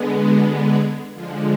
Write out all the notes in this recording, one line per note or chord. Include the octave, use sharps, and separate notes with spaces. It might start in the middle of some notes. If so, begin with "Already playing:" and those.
Already playing: D3 G#3 B3
F#4
G#4
D3 F3 G#3 F4